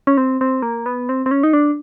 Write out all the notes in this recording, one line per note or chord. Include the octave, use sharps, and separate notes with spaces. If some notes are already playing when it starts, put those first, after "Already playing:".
C#4
C4
C4
A#3
B3
C4
C4
C#4
D#4
D4